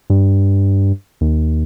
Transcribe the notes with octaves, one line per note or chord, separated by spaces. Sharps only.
G2
D#2